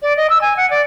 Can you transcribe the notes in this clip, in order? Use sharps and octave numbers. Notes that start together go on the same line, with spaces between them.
D5
D#5
E6
G#5
F#5
D5